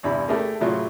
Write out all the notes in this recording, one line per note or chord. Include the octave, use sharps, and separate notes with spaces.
E2 G2 C3 E4 B5
A3 E4 G4 G#4 A#4
A2 C3 F#3 E4 F4 G#4